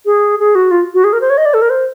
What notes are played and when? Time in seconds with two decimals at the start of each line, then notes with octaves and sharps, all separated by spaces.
0.06 G#4
0.39 G#4
0.55 F#4
0.71 F4
0.94 F#4
1.04 G#4
1.13 A#4
1.21 C5
1.30 C#5
1.38 D#5
1.46 D5
1.54 A4
1.62 A#4
1.70 C5